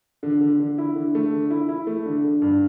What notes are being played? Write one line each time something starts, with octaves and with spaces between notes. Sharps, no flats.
D3
D3
D3
E4
D3
A3
D3
E4
E4
A3
D3
D3
G2